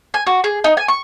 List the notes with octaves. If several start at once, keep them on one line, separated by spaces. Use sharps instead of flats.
G#5
F#4
G#4
D#4
G#5
C#6